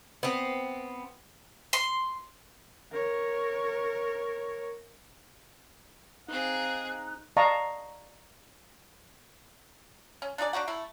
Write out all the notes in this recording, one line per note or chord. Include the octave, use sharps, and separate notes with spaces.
B3 C4
C6
A#4 C#5
C4 D#4 G#4 F5 F#6
D5 D#5 F5 A5 A#5 C#6
C#4
D4 D#4 G#4 D5
D4 D#4 F#4 F#5
A3 E4